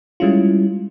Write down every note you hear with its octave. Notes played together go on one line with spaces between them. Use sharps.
G3 G#3 C#4 E4 F4